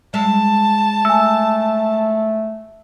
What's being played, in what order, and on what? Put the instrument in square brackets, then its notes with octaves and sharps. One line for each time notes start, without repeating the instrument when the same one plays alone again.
[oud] G#3 E5 F5 [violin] A5
[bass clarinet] A3 [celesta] G#5 E6